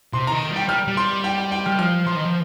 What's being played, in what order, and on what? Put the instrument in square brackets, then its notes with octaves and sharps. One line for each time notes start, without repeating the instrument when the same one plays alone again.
[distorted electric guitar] C3 [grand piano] C6
[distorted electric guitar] D#3 [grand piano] A#5
[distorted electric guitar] G3 [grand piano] G5
[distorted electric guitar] G3 [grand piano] F6
[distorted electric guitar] G3
[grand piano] C6
G5
G5
G5
[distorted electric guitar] G3 [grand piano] F6
[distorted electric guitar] F3 [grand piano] F6
[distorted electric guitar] F3 [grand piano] C6
[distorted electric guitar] D#3
F3